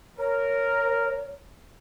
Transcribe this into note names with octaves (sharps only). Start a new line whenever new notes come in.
A#4 C#5